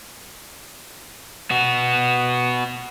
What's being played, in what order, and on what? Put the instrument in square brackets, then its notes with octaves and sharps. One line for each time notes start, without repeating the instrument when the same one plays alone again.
[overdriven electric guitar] B3 F#4